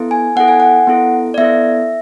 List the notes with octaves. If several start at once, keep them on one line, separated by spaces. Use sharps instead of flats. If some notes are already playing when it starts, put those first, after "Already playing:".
Already playing: B3 E4 A4
G#5
B3 E4 A4 F#5
G#5
F#5
B3 E4 A4
D5
B3 E4 A4 E5